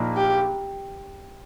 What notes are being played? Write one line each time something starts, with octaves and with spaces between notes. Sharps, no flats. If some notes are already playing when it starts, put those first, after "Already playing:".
Already playing: A#1 A#2 A#3 D#4
G4